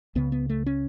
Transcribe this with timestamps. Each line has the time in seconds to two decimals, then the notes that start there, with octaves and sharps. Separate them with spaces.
0.15 C#2 C#3 B3
0.32 B3
0.50 A3
0.66 C#4